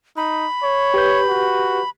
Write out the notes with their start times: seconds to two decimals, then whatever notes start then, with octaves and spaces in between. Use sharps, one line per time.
0.17 D#4 B5
0.63 C#5
0.94 G4 B4 G6
1.28 F#4